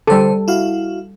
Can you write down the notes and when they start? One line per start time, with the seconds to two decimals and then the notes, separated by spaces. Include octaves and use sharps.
0.07 D3 G3 A4 C5
0.48 E4 F#4 F5